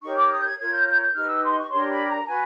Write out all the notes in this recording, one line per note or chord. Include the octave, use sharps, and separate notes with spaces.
D#4 G4 A#4 C#5 C#6
D6
D#6
G6
G#6
F4 A#4 C#5 G#6
G6
G6
G6
D#4 G4 B4 F6
E6
C6
C#6
D4 G4 A#4 C#5 C6
B5
A#5
F#4 B4 G#5